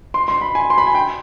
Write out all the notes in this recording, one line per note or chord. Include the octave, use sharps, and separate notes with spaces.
C6
C6
B5
G#5
C6
B5
G#5
G5